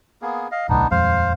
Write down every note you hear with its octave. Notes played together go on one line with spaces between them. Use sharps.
A#3 B3 G#4
D#5 F5
D1 B1 A2 B3 D4 D#4
D#1 F2 G#3 C5 F5